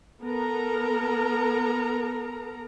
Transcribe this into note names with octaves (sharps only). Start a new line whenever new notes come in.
B3 A4 A#4 A#5